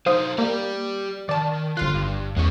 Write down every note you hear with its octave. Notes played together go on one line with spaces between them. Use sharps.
F#3 D#4 C5 F5 D#6
A#3 G4 D5
D#3 D5 A5
G1 F4 C6 F#6
G2
E2 G#3 C#4 C#6